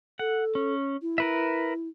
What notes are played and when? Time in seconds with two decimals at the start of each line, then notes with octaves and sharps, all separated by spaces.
0.19 A4 F#5
0.55 C#4
1.02 E4
1.18 A#4 B4 E5